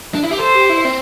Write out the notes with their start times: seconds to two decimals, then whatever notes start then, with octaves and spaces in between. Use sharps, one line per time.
0.15 D4
0.23 E4
0.31 G4
0.39 A4 C5
0.55 G4
0.69 E4
0.84 C4